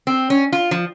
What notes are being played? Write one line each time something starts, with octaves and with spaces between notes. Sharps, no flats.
C4
C#4
F4
F3